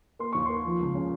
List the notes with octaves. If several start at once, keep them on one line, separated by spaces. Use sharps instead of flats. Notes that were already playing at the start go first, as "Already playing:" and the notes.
A#3 C6
D#2 C#6
A#3 C6
F3
C#2
C#3